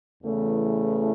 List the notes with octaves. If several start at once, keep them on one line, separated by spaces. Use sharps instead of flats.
E2 C#3 E3 A3